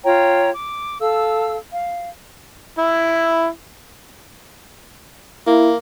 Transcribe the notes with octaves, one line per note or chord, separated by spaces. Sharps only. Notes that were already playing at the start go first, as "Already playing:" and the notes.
F4 C#5 G5 A#5
D6
A4 F5 E6
F5
E4
A#3 E4